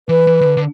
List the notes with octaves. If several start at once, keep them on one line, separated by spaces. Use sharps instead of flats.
E3 B4
E3
D#3
D3
D3